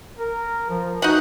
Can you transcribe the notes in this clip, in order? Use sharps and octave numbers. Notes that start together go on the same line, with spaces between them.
A#4
F3
D#4 F#4 F#5